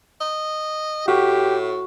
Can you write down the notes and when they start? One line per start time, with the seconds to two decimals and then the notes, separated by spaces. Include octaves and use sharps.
0.21 D#5
1.08 A2 F#4 G4